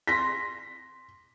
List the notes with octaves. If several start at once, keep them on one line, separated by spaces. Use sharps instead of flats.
C6 A#6 B6